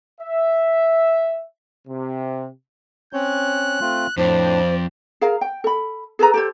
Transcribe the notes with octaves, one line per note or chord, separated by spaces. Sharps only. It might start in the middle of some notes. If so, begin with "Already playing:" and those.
E5
C3
C4 C#4 C#5 F#6
A3 C4 F4
F2 A2 D4 C5 D5
G#4 A#4 F5 A#5
G5
A4 B5
G#4 A4 B4 A#5
G4 A4 C5